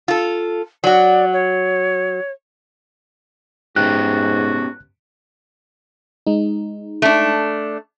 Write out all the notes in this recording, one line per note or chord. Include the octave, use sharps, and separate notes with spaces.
F4 A4
F#3 F#4 D5
C#5
G#2 B3 C#4 F#4 G4 F#6
G#3 D#4
A3 D4